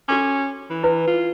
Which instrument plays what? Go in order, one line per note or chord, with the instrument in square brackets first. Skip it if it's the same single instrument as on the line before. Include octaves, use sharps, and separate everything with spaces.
[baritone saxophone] C#4 [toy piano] F#4 A4 D6
[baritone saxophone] E3
[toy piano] E4 B4
[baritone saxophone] F4